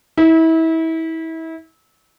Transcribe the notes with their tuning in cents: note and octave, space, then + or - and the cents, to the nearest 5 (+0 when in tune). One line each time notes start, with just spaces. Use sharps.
E4 -30